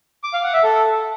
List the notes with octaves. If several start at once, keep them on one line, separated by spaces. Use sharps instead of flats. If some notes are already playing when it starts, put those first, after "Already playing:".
D6
F5
F#5
E5
A4